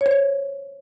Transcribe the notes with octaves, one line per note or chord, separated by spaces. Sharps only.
C#5
C5
C#5